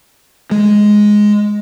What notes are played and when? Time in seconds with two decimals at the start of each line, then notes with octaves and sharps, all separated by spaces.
0.51 G#3